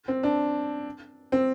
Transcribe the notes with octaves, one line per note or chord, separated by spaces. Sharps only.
C4
D4
C4